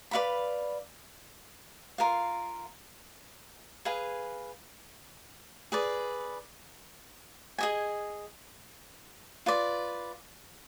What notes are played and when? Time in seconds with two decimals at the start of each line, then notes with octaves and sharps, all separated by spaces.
0.11 B4 D5 F5 B5
1.98 F4 A#4 F5
3.85 G#4 B4 F5 G#5
5.72 G#4 B4 D5
7.58 G#4 D#5 G#5
9.46 F4 B4 D5